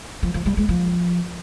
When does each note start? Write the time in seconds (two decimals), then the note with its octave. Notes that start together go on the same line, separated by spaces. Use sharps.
0.23 F3
0.34 F3
0.46 G3
0.57 G#3
0.69 F3